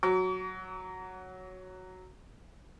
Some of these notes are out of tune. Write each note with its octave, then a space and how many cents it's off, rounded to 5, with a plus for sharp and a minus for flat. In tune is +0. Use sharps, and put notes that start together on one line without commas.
F#3 +0 C#6 +45